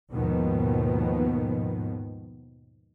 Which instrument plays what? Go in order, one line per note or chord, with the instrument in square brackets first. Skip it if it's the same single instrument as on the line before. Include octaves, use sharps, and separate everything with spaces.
[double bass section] D#2 G#2 B2 D#3 F3 B3